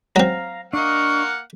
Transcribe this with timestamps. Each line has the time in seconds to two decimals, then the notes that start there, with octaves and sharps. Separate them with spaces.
0.16 F#3 C4 F5 A#5
0.73 A#3 D4 D#5 F5 F#5 C#6